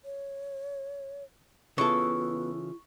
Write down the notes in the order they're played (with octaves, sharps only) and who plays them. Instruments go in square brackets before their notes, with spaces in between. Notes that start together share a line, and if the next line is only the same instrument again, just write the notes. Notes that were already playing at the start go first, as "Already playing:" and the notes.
[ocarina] C#5
[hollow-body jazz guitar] C#3 E3 A4 [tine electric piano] B3 B4 [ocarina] F4 [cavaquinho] C#6